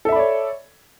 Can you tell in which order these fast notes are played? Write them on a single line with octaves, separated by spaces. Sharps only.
A4 E5 B5 D5 C#5